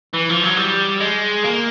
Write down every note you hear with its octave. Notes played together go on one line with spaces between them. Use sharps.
E3
F3
F#3
G3
G#3
A#3